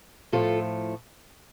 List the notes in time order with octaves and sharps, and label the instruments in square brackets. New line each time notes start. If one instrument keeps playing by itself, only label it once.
[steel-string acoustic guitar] A2 F3 A3 F4 A4